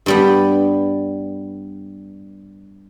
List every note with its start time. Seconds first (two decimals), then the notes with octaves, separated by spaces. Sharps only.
0.06 G2 G3 B3